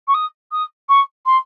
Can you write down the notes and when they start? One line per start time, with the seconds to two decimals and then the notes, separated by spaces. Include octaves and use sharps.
0.08 C#6
0.14 D#6
0.52 D#6
0.89 C#6
1.26 C6